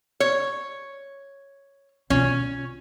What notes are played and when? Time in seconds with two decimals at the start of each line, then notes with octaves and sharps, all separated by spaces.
0.20 C#5
2.10 B2 C#4 F4